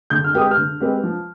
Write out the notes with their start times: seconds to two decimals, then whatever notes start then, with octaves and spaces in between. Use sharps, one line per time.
0.10 D3 G6
0.24 F6
0.33 G#3 C4 G4 B4 D#6
0.51 F6
0.57 D3
0.80 G#3 C4 G4 B4
1.04 F3